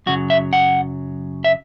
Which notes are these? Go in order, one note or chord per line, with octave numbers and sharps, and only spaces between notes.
F#2 C#3 F#3 F#4
E5
F#5
E5